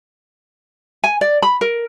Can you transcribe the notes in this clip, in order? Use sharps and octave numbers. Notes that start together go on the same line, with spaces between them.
G#5
D5
B5
A#4